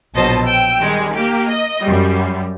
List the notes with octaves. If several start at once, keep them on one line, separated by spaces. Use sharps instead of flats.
A#1 B2 F#3 C5 D#5 A5
G5 E6
D#3 G3 G#3
A#3 G4
D#5
F#2 G3